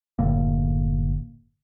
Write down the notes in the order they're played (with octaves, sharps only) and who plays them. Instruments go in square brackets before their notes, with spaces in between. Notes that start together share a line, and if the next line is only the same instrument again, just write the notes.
[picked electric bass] F#1 A2 D3 A#3